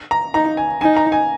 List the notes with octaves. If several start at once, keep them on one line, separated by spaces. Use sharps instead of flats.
A#5
D#4 A#5
G#5
D#4 G#5
A#5
G#5